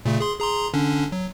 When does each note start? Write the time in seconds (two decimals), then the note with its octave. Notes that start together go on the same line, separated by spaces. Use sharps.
0.05 A#2 C#3 A3
0.20 G#4 C6
0.40 G#4 A#5 C6
0.74 D3 C#4 D4
1.12 F#3